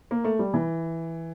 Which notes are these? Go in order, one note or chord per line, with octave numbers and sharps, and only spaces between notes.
A#3
A3
G3
E3